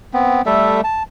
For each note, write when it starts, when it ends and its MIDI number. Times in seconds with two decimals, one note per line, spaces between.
0.14 0.42 59
0.14 0.42 60
0.46 0.81 55
0.46 0.81 57
0.46 0.81 69
0.46 0.81 76
0.84 1.03 81